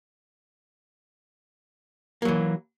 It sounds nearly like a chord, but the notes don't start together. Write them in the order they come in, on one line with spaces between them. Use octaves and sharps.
A#3 F#3 E3